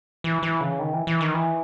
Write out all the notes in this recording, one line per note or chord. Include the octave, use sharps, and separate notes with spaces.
E3
E3
C#3
D#3
E3
E3
D#3
E3